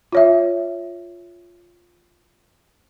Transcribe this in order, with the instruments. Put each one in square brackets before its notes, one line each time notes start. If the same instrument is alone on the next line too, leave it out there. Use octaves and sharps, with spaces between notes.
[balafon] F4 C#5 E5